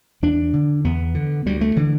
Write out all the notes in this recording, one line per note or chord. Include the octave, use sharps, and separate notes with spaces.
E2 D4
D3
E2 B3
D3
D2 G3
A3
D3 E3